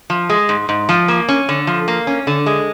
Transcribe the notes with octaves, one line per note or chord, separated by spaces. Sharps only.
F3
G#3
G#2
G#2
F3
A#3
C#4
D3
F3
A#3
C#4
D3
G#3